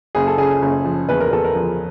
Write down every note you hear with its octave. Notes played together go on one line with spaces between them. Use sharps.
F#1 G#4
A4
C#3 G#4
F#1
F3
E2 B4
A#4
E2 A4
A#4
F3